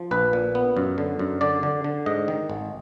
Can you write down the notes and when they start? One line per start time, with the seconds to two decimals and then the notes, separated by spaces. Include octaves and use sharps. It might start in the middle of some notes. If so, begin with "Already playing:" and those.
Already playing: F3
0.11 A#1 B4
0.33 A#2
0.55 B3
0.77 F#2
0.98 D3
1.19 F#2
1.41 D3 D5
1.63 D3
1.84 D3
2.06 G#2 D#5
2.28 D#3
2.50 G#1